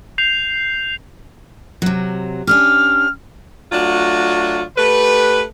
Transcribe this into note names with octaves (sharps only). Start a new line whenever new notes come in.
G6 C7 F7
C3 F#3
C#4 D4 G4 F6
F#3 A3 D4 F4 F#4
A3 G4 B4